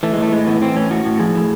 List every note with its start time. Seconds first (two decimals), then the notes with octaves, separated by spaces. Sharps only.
0.03 E3 A3
0.13 G#3
0.18 A2 A3
0.32 A2 G#3
0.47 E3 B3
0.62 E3 C4
0.76 A2 C#4
0.91 A2 F#4
1.05 A2
1.19 F3 G#4
1.35 A2